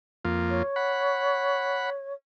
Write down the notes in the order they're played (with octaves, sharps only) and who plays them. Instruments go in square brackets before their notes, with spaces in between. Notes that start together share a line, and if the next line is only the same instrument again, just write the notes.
[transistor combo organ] F2 A#3 F4
[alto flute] C#5
[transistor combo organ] F#5 B5